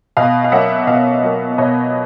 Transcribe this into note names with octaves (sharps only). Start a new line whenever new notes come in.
B2 D#5 F5
F5
F#3 A#3 E5 F#5
B2 D#5 F5
F#3 A#3
B2 C#5 D#5